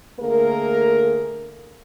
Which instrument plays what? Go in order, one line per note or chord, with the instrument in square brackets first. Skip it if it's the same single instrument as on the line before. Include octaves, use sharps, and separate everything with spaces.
[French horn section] D3 A3 A#3 G#4 A#4